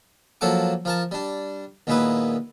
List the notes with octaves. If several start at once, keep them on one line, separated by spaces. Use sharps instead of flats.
F3 F#3 A#3 A4 F#5 D6
F3 A#4 A5
G3 D4
D#2 A#2 G#3 B3 E4 B4